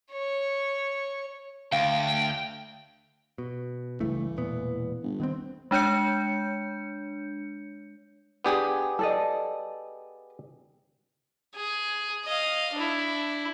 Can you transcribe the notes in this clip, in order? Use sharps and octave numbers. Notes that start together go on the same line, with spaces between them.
C#5
D2 F5 G5
B2
C#2 G2 E3 A3
E1 A#2 B3
G1
D#3 B3 C4
G#3 D4 C#5 G6 C#7
B3 D4 G4 G#4
A4 D5 D#5
G#4
D#5 F5
D4 E4